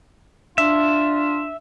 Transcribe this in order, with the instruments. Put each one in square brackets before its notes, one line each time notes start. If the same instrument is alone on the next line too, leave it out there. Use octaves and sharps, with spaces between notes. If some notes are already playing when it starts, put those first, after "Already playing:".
[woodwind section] D4 [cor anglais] F4 [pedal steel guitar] E5